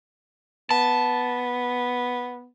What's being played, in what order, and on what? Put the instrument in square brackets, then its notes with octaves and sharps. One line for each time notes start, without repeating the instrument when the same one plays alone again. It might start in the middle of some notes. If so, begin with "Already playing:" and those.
[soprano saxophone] B3 [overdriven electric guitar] A5